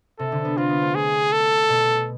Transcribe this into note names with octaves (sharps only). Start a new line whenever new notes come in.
C3 A4
D3
B3
C4 F4
B3
A3
A3 G#4
A4
B2